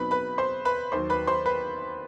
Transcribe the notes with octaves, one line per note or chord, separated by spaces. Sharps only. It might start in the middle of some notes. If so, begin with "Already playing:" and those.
Already playing: B2 F#3 C4 D#4 B4 B5
B4 B5
C5 C6
B4 B5
D#2 D#3 F#3 C5 C6
B4 B5
C5 C6
B4 B5